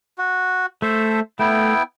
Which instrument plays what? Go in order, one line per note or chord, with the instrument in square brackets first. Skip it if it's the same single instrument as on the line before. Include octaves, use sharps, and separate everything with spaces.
[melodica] F#4
[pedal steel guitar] A3 [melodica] A4 C5 E5
[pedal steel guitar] A3 [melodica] B3 E4 G5